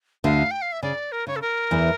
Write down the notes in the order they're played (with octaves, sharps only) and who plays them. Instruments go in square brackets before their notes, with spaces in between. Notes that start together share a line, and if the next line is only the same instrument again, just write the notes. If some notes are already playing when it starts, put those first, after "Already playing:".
[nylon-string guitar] D2 D3 [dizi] F5
[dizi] G5
F5
E5
[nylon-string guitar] C#3 [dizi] D5
[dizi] A#4
[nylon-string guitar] C#3 [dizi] C#5
[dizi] A4
A#4
[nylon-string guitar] E2 E3